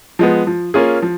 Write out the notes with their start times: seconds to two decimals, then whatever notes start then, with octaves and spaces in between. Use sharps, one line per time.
0.19 F3 G#3 B3
0.47 F3
0.74 A#3 C#4 F4 G#4
1.02 F3